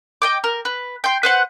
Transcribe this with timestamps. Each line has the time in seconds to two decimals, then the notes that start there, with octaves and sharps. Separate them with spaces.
0.22 D#5 G5 D6
0.44 A#4
0.65 B4
1.04 G5 C6
1.23 B4 C5 F#5